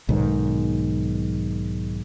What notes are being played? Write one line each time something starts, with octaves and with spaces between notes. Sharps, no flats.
B1 G#2 D#3